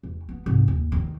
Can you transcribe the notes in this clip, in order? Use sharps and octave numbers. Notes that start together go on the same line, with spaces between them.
E2
B3
C2 G#2
D#2
E2 D#3